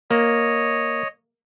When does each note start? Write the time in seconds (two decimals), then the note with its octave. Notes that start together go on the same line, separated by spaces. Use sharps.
0.11 A#3 C#5 D#5